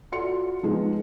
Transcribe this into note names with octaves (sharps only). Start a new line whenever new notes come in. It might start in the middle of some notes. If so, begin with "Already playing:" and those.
F4 F#4 A4 D5 C6 C#7
F3 G#3 B3 D#4 F4